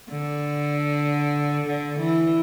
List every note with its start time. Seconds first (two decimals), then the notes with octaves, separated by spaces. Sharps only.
0.10 D3
1.67 D3
1.98 E3